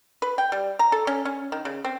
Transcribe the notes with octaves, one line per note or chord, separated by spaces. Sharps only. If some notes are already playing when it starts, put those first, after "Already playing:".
B4
G5
G3
A#5
A4
C#4
C#4
D#3
C#3
C4